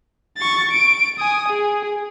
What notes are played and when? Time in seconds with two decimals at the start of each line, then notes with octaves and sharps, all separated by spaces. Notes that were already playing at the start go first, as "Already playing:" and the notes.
0.37 C#6 A6
0.71 D7
1.19 G#5 D#6
1.49 G#4